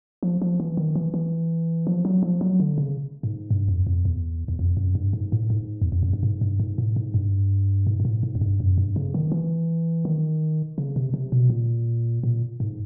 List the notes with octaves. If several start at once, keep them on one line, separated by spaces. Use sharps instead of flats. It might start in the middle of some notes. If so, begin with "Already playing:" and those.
F3
F3
E3
D#3
E3
E3
F3
F#3
F3
F#3
D3
C#3
G#2
G2
F2
F2
E2
E2
F2
F#2
G2
G#2
A2
G#2
E2
F2
F#2
G2
G#2
G2
G#2
A2
G#2
G2
G#2
G#2
A2
G#2
F#2
G2
F#2
G2
C#3
D#3
E3
D#3
C#3
C3
C3
B2
A#2
A#2
G#2